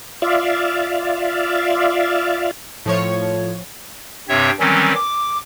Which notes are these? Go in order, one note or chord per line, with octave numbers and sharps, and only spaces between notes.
F4 D5 E5 F5
A2 F3 C#5
G2 C3 C4 C#5 E5
D#3 E3 F#3 G3 C4 C#4
D6